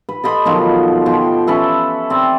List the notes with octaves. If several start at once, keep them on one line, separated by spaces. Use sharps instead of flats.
B4
A4 D#5 B5 C6
B2 D#3 F3 F#3
B2 F3 G5 C6
C#4 A4 B4 E5
C4 D5